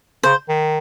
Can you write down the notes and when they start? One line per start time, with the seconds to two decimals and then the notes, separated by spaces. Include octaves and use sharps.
0.23 C#3 C5
0.49 D#3